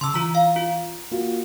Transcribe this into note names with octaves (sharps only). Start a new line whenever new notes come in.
C#3 A5 C6 D6 E6
E3 F4 A#5
F5
F4
A#3 F4 F#4